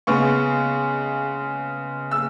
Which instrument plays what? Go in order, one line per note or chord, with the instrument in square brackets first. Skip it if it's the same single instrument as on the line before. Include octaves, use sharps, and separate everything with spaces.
[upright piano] C#3 G#3 B3 C#6
E6